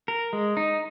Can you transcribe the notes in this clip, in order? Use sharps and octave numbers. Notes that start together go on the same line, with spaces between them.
A#4
G#3
D#4